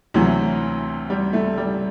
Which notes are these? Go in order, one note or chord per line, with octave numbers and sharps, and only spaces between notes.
D2 C3 E3 F#3
G3
A3
G3